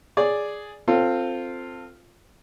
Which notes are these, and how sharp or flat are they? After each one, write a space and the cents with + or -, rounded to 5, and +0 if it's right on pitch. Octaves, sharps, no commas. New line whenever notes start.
G#4 +0 D5 +0
C4 +0 F4 +0 A4 +20